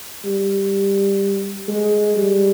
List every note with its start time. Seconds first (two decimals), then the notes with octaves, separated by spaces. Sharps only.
0.25 G3
1.68 G#3
2.16 G3